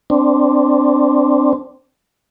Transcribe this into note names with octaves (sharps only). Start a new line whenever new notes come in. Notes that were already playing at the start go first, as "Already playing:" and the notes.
C4 D4